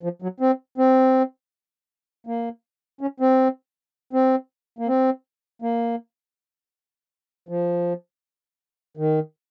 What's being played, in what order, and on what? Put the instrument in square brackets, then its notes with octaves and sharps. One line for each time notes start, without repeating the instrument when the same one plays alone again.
[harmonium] F3
F#3
C4
C4
A#3
C#4
C4
C4
A#3
C4
A#3
F3
D#3